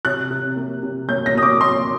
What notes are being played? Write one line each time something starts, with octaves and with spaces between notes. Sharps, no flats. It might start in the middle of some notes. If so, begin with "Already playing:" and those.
C3 F#6
C3
A#3
C3
A#3 G6
A#6
A#3 D#6
D6
A#3 C6